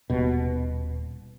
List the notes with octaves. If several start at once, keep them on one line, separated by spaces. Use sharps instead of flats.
D#1 B2